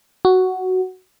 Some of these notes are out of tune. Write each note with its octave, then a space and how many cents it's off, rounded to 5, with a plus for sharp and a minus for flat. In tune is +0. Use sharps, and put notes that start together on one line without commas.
F#4 +5